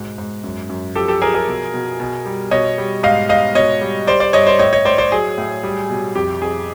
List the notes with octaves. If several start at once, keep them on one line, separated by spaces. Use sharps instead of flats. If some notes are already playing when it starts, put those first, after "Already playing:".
Already playing: G#2 B2
G#2
F#2
F#2
F3 G4 A4
G4 A4
F3 G#4 A#4
G#4 A#4
B2
B2
B2
G3
B2 C#5 D#5
G3
G#2 D#5 F5
G#2 D#5 F5
B2 C#5 D#5
G3
G3 C5 D5
C5 D5
G2 C#5 D#5
C5 D5
A2 C#5 D#5
C#5 D#5
A2 C5 D5
C5 D5
F#3 G#4
A2
G3
B2
F2 G4
F2 G#4